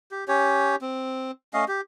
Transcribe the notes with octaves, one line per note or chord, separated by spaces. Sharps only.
G4
C#4 G4 C#5
C4
A3 C#4 D#5 F5
G4